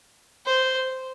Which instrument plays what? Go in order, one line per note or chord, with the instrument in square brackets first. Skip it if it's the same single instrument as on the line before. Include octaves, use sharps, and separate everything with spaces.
[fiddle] C5